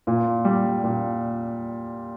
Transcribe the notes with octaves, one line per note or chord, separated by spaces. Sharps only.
A#2
G3
A#2